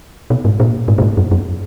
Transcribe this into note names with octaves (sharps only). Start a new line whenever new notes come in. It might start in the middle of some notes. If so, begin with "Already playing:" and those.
B2
G#2
A#2
G#2
A#2
G#2
F#2
F#2